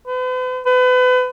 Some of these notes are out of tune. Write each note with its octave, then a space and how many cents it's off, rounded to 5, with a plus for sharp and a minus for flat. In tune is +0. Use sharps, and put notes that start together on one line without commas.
B4 +45
B4 +35